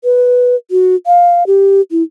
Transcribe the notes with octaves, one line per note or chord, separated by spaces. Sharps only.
B4
F#4
F5
G4
E4